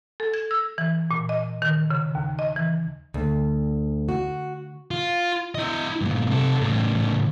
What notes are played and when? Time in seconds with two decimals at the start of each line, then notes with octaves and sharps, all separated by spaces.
0.20 A4
0.34 G#6
0.51 E6
0.78 E3
1.11 A#2
1.29 D#5
1.62 D#3
1.90 C#3
2.15 D#2
2.39 D#5
2.56 E3
3.14 D2
4.09 F#4
4.91 F4
5.55 E4 D#5
6.01 G2 A#2
6.29 C3 A4
6.61 A2 C#3